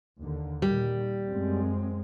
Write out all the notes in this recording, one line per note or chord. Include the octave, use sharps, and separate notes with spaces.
D#2 D3
A#2 D#3 G3
F#2 G#3 C4